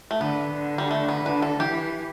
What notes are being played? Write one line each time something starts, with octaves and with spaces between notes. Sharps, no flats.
A3
D3 B3
D3
G3
A3
B3
D3 B4
A4
E3 G4